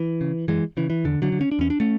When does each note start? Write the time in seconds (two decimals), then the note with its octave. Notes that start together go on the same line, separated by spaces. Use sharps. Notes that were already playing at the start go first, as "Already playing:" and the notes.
Already playing: E3
0.21 C#3
0.48 F#2 E3 G#3
0.77 C#3 E3
0.90 E3
1.04 E2 D3
1.22 D3 F#3
1.32 D3
1.41 C#4
1.51 D4
1.59 E2 C#4
1.70 D4
1.80 A3 C#4